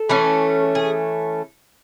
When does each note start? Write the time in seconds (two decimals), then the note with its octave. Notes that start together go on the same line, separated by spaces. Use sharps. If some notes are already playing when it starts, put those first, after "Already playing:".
Already playing: A4
0.09 E3 A3 C#4
0.75 G#4